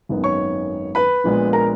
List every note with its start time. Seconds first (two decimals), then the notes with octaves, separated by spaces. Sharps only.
0.09 G#1 F#2 D#3 G#3 B3
0.24 C#5 C#6
0.95 B4 B5
1.24 A#1 A#2 G#3 B3
1.53 A#4 A#5